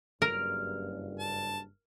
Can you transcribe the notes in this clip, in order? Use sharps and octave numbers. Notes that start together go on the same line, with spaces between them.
F#1 G2 A#4 F6 D7
A5